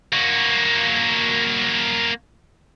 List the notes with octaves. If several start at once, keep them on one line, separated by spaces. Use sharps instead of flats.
A#3 F#4